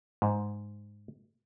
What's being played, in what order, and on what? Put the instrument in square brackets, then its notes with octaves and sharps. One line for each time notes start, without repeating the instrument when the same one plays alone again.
[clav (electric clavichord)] G#2